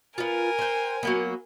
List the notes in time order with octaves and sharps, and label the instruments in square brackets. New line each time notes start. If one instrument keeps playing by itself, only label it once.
[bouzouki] B3 F4 [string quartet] A#4 G#5
[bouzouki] C5 G5
F#3 A#3 B3